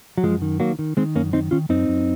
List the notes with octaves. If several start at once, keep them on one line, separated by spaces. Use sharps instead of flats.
F#3
F#2 F3 G#3
D#3
D#3 F#3 A#3
D#3
D#3 G#3 C4
F#2 A#3 C#4
D#3 C4 D#4
D#3 C#4 F4
F#2 C4 D#4
F#2